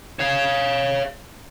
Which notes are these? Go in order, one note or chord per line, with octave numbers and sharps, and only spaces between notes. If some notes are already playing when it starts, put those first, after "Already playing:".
C#5 F5